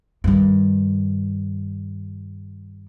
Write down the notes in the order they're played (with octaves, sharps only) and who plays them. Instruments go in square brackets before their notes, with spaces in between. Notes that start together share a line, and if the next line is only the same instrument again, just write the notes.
[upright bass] G2 D#3